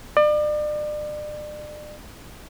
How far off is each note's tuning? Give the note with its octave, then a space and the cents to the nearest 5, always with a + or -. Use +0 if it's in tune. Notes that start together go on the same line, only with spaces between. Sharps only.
D5 +35